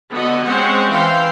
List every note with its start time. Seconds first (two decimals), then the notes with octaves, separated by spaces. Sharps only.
0.11 D3 B3 F#4 D#5
0.43 G#3 C4 C#4 C5 C#5 F#5
0.90 E3 F5 G5 C6